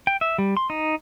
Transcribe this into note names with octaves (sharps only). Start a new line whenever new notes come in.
G5
E5
G3
C6
D#4